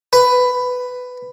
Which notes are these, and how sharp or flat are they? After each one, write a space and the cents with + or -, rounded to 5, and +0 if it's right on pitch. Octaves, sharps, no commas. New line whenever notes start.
B4 +10